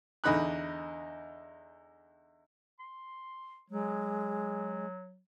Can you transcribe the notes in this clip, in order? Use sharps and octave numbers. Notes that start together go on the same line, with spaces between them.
E2 D3 D#4 B5 F#6
C6
F#3 G#3